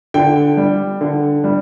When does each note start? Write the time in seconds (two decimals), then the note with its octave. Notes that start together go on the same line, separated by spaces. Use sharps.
0.14 D3 G5
0.57 G3
1.01 D3
1.44 G3